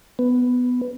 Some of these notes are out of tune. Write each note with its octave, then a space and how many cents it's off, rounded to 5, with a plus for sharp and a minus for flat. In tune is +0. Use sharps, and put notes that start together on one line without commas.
B3 +10